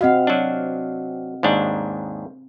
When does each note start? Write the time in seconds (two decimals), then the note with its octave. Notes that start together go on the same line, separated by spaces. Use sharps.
0.01 C4 F#4 D#5 F5 F#5
0.27 F#3 D4
1.43 D#2 G#2 D4